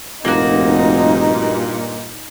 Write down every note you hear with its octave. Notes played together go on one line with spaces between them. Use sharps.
F1 G2 A#2 A#3 D#4 F#4